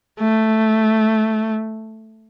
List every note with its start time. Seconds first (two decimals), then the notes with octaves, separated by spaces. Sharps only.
0.20 A3